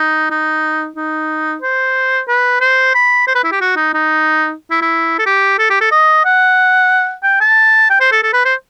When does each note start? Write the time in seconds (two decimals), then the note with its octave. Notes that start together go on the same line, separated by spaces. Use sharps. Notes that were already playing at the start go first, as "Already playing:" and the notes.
Already playing: D#4
0.30 D#4
0.96 D#4
1.62 C5
2.28 B4
2.61 C5
2.95 B5
3.27 C5
3.35 B4
3.44 E4
3.52 G4
3.61 F#4
3.76 D#4
3.94 D#4
4.70 E4
4.81 E4
5.19 A4
5.26 G4
5.59 A4
5.70 G4
5.81 A4
5.91 D#5
6.25 F#5
7.23 G5
7.40 A5
7.90 G5
8.00 C5
8.12 A4
8.23 A4
8.33 B4
8.45 C5